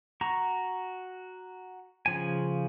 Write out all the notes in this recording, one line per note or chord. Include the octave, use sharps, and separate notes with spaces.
F#4 A#5 C#6
C#3 F3 G#5